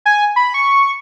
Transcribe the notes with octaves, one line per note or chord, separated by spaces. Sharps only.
G#5
B5
C#6